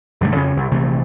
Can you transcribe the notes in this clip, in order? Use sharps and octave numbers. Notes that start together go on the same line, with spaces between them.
B1 G2 D3 A3
F2 C#3 C#4
C2
A#1 C3 E3 A3